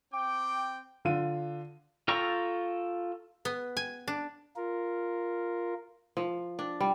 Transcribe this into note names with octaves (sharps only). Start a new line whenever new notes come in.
C4 G5 D6
D3 F4 D#7
F4 A4 G5 A#5 C#6
B3
G#5
D4
F4 A#4
F3
D4
G3